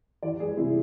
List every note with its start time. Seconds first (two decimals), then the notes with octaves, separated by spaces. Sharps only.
0.23 E3 D5
0.40 G#3 G#4
0.57 C3 E4